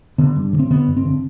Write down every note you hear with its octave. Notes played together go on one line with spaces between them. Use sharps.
D3 B3
G2
D3
C4
D3 B3
G2
C4
D3